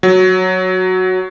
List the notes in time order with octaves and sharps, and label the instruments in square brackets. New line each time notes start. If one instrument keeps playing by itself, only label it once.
[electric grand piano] F#3